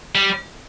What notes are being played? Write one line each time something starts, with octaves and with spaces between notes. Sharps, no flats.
G3